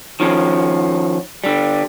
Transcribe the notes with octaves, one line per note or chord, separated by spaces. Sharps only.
D#3 F3 C#4
D3 G3